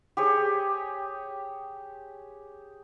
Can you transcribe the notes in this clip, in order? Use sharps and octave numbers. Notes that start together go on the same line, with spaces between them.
G4 G#4 C#5